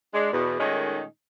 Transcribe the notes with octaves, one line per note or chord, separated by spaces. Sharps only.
G#3 D4
E2 B2
A#2 D#3 G#3 A3 C#4 D#4